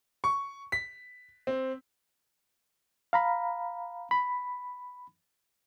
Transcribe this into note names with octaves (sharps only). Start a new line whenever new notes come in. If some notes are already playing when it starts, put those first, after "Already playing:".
C#6
B6
C4
F5 A#5 B5
B5